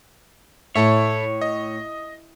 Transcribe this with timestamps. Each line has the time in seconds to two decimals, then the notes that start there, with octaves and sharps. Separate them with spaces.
0.75 A2 E4 A4 C#5 E5
1.41 D#5